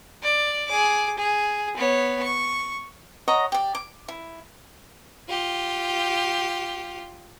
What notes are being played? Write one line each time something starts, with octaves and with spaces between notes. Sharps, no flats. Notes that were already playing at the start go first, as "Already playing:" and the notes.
D5
G#4 D6
G#4
B3 C#5
C#6
C#5 D#5 F#5 A#5
G4 D5
D6
E4
F4 G4